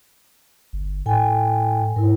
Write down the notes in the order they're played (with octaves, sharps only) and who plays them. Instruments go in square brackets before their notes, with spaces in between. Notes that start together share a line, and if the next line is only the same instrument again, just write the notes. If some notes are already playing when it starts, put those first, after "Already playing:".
[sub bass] G1
[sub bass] A2 [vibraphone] A4 G5 G#5
[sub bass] G#2 [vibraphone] E4 A#4